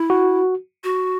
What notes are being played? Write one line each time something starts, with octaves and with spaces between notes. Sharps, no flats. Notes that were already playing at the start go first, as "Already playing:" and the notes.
Already playing: E4
F#4
F#4